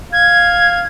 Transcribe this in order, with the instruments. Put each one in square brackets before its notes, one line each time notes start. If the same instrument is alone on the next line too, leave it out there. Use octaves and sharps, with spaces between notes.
[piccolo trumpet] F5 [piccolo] G#6